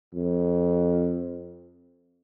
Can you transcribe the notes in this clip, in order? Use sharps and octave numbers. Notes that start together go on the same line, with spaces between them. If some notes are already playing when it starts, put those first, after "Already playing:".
F2